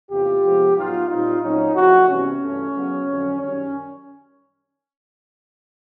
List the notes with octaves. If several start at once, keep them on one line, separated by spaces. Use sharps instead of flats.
E2 C3 E3 A3 F4 G4
F2 C3 F3 G#3 B3
A2 F#3 B3 D#4 F4
A#2 G3 C4 D#4 F4
A#2 F#3 A3 C4 C#4 D#4
C#3 F3 A3 E4 F#4
C3 E3 G3 B3 C#4
G2 E3 A3
C#3 F#3 B3
F2 D3 F#3
F#2 D#3 G3 C#4